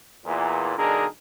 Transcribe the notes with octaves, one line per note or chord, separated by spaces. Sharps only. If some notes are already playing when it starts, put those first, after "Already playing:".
E2 A#2
B1 D3 D4 D#4 G#4 A#4